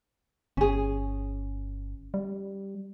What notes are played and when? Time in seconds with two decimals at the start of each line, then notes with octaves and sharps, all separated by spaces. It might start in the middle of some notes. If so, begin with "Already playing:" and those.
0.57 G1 C#4 G#4
2.14 G3